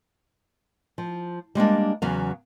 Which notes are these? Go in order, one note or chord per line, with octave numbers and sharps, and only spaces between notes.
F3
G3 G#3 A#3 D4
E2 C#3 F#3 F5